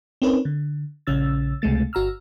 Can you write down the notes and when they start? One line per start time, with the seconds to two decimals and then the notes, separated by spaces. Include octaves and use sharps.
0.22 C4 C#4 D#4 A#4 B4 C#5
0.45 D3
1.07 A#1 C#3 C#4 E6 A6
1.62 C#2 C3 G#3 A3 A6
1.93 G1 F#4 A#5 E6 F6